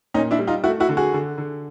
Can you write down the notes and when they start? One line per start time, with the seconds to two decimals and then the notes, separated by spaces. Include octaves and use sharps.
0.14 A#2 C#4 D#4
0.31 D4 E4
0.39 G3
0.47 D#4 F4
0.64 A3 E4 F#4
0.80 E4 F#4
0.89 D3
0.97 F#4 G#4
1.14 D3
1.38 D3